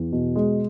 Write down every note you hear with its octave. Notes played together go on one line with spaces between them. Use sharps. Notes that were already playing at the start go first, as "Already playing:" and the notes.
Already playing: E2
B2
G#3